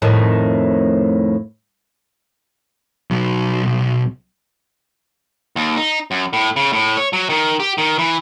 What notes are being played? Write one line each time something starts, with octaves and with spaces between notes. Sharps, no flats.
F2 A2 D#3
B1 F#3
D#2
D#4
F#2
A2
C#3
A2
C#5
F#3
D#3
G4
D#3
E3